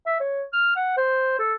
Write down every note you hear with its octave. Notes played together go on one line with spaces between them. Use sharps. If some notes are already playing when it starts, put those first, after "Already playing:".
E5
C#5
F6
F#5
C5
A4